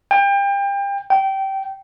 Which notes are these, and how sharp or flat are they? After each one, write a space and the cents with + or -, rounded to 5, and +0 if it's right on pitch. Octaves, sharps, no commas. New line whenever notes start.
G5 +30
G5 -20